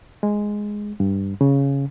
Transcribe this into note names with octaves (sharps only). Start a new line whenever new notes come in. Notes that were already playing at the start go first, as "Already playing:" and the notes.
G#3
G2
C#3